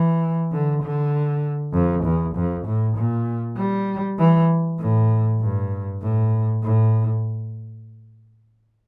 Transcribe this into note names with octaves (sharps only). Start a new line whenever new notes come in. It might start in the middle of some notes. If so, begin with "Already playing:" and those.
Already playing: E3
D3
D3
F2
E2
F2
A2
A#2
G3
E3
A2
G2
A2
A2